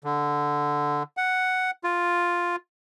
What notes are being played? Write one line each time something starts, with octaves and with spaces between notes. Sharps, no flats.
D3
F#5
F4